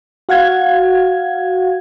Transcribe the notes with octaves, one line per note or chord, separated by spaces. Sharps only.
F#4 F5 F#5 G#6